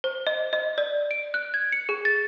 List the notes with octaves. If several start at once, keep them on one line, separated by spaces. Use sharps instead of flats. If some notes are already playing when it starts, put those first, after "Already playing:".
C5
D#5
D#5
D5
D7
F#6
G#6
C#7
G#4
A6